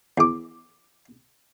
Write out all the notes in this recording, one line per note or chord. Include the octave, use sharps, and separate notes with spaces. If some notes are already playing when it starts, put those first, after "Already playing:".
E2 D6